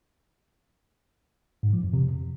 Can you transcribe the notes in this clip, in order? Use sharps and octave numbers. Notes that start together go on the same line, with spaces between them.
G#2
F3
F2
C3